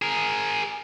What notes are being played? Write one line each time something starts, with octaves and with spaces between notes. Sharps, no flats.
G#4 A#4